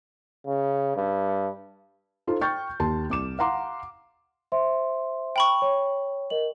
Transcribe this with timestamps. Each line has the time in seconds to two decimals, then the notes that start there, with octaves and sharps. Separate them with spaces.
0.46 C#3
0.96 G2
2.27 D#4 F4 A4 C5
2.41 G5 C#6 F6 G6 A6
2.80 D#2 A5 C6
3.10 C2 D6 E7
3.39 F5 F#5 A#5 C6 D6
4.52 C5 E5 C6
5.36 G5 B5 C#6
5.62 C#5
6.30 A#4 D#5 F#7